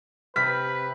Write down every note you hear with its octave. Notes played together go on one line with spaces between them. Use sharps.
C3 B4 F6 B6